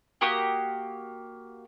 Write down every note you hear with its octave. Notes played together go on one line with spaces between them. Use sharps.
A#3 F#4 G4 D#6